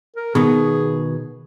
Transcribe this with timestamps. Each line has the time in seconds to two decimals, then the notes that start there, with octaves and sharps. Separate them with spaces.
0.16 A#4
0.35 B2 D#3 B3 G#4